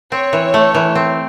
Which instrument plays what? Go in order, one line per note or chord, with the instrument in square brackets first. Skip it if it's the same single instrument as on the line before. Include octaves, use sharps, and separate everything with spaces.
[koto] C4 [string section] C#5
[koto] E3
A3
E3
C4